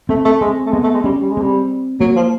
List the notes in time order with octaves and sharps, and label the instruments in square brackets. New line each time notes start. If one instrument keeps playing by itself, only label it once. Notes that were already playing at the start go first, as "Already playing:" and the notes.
[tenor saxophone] A3 [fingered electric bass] C4
[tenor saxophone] A3 [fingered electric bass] C4
[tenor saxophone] G#3 [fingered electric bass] C4
[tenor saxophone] A3
[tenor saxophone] G#3 [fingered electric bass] B3
[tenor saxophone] A3
G#3
[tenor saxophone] G3 [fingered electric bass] C#4
[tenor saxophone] G3
G#3
[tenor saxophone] G3 [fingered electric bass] C4
[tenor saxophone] F#3 [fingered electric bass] A#3
[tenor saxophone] F3